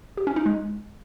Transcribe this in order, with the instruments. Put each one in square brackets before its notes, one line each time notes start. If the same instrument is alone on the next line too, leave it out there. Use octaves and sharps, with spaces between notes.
[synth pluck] G4
C#4
D#4
G#3